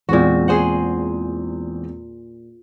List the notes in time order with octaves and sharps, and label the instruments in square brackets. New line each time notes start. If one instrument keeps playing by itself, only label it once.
[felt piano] E2 G#3 C4 [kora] A#2 F#4
[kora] G#4 C5 F#5